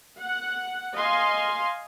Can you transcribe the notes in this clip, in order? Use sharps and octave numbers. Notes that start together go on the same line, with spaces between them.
F#5
D#5 F5 G#5 C6